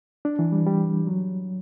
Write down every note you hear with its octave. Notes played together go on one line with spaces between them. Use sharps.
D4
E3
G3
G3
F#3